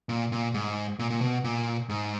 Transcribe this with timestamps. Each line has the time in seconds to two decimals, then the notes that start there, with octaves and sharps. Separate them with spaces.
0.09 A#2
0.32 A#2
0.54 G#2
0.99 A#2
1.10 A#2
1.21 B2
1.44 A#2
1.89 G#2